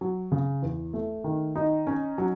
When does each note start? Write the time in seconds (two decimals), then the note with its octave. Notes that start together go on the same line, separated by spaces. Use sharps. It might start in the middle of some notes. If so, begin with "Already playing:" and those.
0.01 F#3
0.32 C#3
0.62 E2
0.93 A3
1.24 D#3
1.56 D#4
1.87 C#4
2.18 F#3